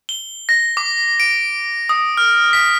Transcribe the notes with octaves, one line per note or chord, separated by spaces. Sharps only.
G7
A#6
D6
D7
D#6
F6
B6